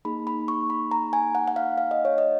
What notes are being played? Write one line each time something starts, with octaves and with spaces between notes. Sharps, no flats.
A#3 D#4 G#4 B5
B5
C#6
B5
A#5
G#5
F#5
F#5
F5
F5
D#5
C#5
D#5